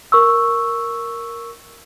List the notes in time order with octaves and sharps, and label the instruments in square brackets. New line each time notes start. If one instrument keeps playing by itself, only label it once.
[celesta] A#4 C#6 E6